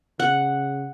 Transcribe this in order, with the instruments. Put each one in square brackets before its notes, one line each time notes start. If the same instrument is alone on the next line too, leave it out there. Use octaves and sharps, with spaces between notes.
[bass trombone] C#3 [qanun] F#5